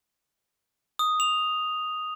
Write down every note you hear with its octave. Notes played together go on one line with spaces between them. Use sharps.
D#6
F7